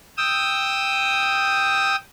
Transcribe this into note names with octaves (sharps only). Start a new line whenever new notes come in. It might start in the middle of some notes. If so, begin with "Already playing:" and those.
G5 D#6 E6